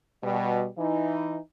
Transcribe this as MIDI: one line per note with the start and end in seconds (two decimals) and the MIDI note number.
0.24 0.66 47
0.24 0.66 55
0.78 1.38 52
0.78 1.38 63
0.78 1.38 64